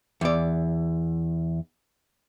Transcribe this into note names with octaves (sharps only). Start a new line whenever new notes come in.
E2 D5